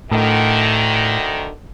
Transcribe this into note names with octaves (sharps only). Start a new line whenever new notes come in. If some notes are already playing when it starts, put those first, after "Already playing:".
D2 A2 D3 D#3